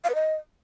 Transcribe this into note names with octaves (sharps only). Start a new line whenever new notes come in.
F5
B4
D#5